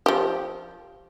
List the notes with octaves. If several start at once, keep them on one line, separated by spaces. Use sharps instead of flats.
F3 G4